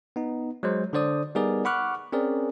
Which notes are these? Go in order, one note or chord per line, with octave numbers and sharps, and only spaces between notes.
B3 D#4
F#3 G#3 C5
D3 D4 C5 D5 D#6
G3 B3 D#4 G#4 A#4 D5
F#5 B5 C#6 D6 F6 F#6
C4 C#4 G#4 A#4 D5